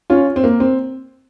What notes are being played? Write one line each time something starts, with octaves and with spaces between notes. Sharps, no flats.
C#4 F4
C4
A#3
C4